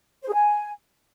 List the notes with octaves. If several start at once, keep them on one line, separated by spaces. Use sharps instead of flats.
C5
G#4
G#5